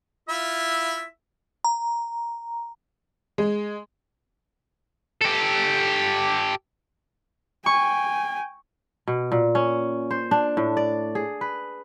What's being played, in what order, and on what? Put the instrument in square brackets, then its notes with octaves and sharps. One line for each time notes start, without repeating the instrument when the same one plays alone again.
[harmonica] E4 F4 E5
[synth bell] A#5
[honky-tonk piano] G#3
[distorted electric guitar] G4 A4
[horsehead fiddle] G5 G#5 [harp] C#6
[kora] B2
A#2
C#4
C5
D4
A2
D5
G#4
B4